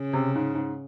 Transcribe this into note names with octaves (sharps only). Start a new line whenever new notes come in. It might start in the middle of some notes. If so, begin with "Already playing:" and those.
Already playing: C#3
C3
G#2
G#2